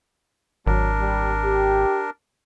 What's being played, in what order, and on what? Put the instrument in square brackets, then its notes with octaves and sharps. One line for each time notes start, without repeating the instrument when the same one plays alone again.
[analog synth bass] G#1 [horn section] F#3 [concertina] D4 A#4
[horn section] G3
G4